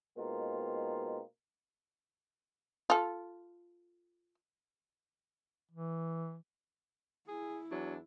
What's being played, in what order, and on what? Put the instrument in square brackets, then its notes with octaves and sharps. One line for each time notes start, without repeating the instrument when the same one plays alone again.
[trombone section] B2 G#3 A#3 C4 D#4 F4
[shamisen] F4 A4
[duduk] E3
[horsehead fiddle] E4 [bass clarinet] G#4
[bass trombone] E2 [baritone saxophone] F#3 [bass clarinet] D4